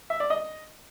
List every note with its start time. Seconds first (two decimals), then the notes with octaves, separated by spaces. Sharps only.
0.10 E5
0.20 D5
0.30 D#5